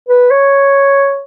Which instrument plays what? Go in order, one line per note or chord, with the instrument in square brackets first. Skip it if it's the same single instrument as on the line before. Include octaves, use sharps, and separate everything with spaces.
[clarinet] B4
C#5